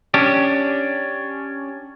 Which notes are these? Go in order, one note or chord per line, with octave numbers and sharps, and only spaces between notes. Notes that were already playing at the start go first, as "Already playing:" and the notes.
C#4 D4 G4